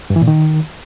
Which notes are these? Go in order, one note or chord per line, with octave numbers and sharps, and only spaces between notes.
G2
E3
A#2
D#3